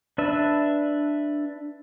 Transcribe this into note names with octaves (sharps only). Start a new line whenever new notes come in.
D4 B4 E5